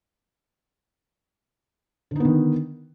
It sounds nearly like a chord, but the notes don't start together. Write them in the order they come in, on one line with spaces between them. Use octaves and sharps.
D3 D#4 B3 D#3